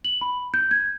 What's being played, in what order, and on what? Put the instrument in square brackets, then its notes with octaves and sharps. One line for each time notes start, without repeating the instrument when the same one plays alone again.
[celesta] F#7
B5
G6
G#6